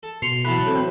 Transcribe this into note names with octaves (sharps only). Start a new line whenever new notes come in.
A4
B2 C6 C7 C#7 F7
A2 E3 F#3 B4 A5
C4 A4